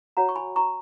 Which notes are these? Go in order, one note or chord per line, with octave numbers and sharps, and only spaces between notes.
F#4 C#5 F#5 A#5
C#6
G#5 B5
A#5 C#6